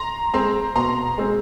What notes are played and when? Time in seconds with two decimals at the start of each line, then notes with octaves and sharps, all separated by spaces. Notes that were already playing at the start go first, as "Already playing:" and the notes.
Already playing: A#5 C6
0.34 G#3 C4 A#5 C6
0.76 B2 A#5 C6
1.18 G#3 C4